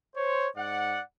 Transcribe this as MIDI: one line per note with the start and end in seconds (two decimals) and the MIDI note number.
0.16 0.47 72
0.16 0.47 73
0.56 1.00 44
0.56 1.00 74
0.56 1.00 78